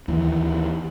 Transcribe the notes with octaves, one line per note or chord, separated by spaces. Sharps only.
D#2 E3